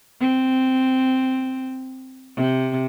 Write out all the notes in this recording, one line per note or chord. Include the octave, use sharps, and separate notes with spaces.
C4
C3